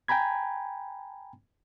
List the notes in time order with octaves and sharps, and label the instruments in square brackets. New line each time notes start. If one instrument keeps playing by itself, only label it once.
[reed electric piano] G5 G#5 A#5 B5 G#6